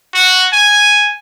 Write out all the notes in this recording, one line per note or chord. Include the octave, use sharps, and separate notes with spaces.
F#4
G#5